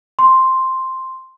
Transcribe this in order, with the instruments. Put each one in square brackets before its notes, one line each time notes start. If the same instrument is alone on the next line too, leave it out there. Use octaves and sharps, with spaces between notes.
[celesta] C6